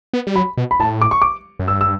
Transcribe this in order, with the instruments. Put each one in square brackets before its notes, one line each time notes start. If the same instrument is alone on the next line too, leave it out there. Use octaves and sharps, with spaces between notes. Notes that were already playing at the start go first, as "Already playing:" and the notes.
[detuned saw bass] B3
G3
[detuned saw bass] F#3 [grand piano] B5
[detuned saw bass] B2
[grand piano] B5
[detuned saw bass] A2 [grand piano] A5
[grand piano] D6
C#6
D6
[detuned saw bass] F#2
[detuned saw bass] G2 [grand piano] E6
[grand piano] E6